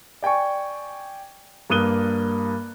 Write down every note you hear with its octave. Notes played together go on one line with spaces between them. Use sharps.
D5 G5 G#5 C#6
G2 A#3 D#6 F#6 D#7 G7